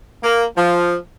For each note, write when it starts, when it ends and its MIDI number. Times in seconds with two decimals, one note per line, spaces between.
0.23 0.44 58
0.56 0.95 53